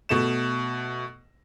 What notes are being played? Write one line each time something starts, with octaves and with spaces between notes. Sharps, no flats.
B2 A3 E7